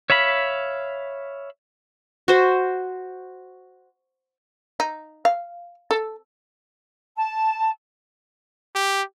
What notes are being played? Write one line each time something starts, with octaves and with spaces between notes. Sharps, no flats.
C#5 E5 F5 B5
F#4 C5
D#4
F5
A4
A5
G4